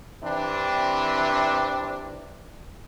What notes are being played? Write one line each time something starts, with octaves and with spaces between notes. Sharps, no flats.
C3 E3 C4 D4